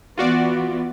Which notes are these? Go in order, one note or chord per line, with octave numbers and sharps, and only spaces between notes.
E3 B3 F4 F#4 D5